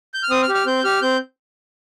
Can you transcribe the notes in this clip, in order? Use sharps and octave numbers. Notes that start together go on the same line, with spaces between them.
G6
F6
C4 D#6
F6
G4
F6
C4 G6
G4 F6
C4 G6